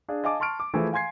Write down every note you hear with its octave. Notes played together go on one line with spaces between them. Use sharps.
D4 G#4 D5 F5
D#5 F5 G#5 A5 D6
A5 C6 C#6 F6 D7
D6
E3 F3 A3 G#4 A4
F5 G#5 C6 G#6 C7